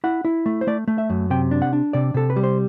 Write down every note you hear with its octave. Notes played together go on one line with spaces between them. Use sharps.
E4 F#5
E4
A3
C5
A3 D5
A3
E5
F#2
C3 G5
D4
F#5
D4
C3 D5
C3 A4
B4
G3
C5